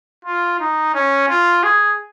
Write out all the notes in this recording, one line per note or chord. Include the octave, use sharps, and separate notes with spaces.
F4
D#4
C#4
F4
G#4